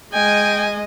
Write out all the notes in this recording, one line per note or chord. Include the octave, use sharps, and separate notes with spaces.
G#3 D#5 G5 G#5